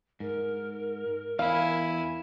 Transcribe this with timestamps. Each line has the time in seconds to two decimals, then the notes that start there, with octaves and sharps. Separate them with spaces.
0.20 G#2 A#4
1.39 E2 E4 F5 G#5